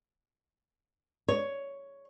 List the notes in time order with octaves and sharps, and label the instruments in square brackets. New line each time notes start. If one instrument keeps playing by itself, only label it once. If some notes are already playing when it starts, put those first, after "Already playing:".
[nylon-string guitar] C#5